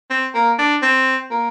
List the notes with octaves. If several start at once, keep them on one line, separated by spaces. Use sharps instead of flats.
C4
A#3
D4
C4
A#3